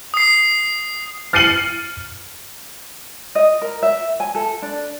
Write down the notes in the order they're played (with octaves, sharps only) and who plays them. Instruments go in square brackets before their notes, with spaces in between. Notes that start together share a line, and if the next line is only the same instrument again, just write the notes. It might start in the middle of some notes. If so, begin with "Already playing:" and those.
[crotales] D#6 C7
[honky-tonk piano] F6 A6 C7 C#7 D#7 F#7
[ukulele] D#5
A#4
E5
G#5
A4
D4